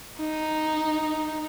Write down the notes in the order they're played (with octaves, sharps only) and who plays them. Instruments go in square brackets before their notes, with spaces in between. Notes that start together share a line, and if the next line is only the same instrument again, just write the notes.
[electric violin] D#4